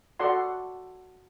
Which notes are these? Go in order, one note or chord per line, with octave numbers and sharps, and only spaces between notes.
F#4 A4 D5 F#5 C6